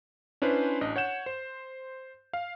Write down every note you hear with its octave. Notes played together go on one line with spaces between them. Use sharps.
C#4 D4 E4 B4 C5
A1 D4 D#5
C#5 F#5 G6 E7
C5
F5